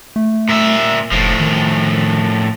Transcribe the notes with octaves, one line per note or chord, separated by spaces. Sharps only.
A3
A#2 E5
F1 A2 F3
D#3